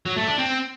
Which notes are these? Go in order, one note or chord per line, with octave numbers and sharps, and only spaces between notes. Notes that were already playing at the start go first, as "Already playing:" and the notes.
F#3
A3
D4
C4